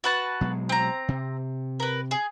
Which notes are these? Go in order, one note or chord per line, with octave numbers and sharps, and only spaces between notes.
F#4 B4 A5
B2 F#3 G#3
C4 A#5
C3
A#4 B4
G#4